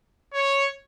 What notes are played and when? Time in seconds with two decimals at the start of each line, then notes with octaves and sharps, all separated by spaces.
0.34 C#5